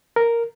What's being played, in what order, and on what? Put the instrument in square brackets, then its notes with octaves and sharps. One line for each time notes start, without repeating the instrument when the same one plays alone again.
[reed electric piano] A#4